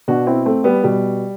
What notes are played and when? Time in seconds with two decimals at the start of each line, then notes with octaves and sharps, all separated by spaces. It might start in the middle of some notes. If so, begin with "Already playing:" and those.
0.08 B2 D4 F#4
0.26 C4 E4
0.46 A3 C4
0.64 G3 B3
0.84 B2 G3